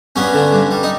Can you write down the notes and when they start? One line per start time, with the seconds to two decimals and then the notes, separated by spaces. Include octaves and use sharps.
0.16 G2 B3 C#4
0.34 D3
0.53 G2
0.71 G3
0.83 D#4